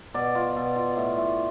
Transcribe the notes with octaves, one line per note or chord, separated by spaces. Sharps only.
B2 D5
F4
B2
F4
A2
A2